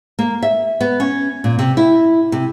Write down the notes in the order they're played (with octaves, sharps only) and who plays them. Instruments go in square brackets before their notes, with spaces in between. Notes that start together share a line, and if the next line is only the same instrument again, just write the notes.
[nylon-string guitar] A#3
E5
B3
C#4
A#2
C3
E4
C3